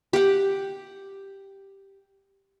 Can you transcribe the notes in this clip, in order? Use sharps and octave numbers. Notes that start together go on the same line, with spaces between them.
G4 F#5